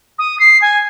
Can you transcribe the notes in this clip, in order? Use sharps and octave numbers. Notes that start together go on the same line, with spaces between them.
D#6
C7
G#5